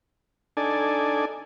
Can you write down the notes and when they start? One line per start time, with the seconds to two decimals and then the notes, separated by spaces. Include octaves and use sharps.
0.57 D4 D#4 A4 D5 G#5